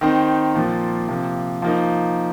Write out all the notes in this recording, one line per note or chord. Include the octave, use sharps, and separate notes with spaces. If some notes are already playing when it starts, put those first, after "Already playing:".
D#3 C4 D#4
A#2 F3 A#3
C3 F3 A#3
F3 A#3 D#4